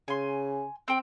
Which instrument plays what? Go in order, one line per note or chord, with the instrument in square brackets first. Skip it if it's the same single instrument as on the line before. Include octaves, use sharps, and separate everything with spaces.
[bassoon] C#3 [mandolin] G#5 C6
[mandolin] C4 G5